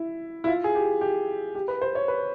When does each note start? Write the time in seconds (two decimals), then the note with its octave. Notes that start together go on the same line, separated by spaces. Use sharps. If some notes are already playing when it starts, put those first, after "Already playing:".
Already playing: E4
0.44 E4
0.47 F4
0.64 G#4
0.75 G4
1.01 G4
1.55 G4
1.68 B4
1.81 C5
1.95 C#5
2.08 B4